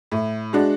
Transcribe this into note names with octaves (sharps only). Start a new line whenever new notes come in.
A2
G#3 D4 F#4